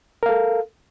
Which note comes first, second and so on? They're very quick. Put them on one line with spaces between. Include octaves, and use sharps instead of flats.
A#4 F5 A4